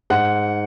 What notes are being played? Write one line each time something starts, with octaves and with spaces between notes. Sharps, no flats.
G#2 F#5